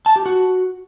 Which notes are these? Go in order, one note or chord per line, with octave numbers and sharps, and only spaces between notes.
A5
G4
F#4